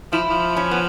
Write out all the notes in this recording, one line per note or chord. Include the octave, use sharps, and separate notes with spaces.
F3 E4
F3
C#4
B3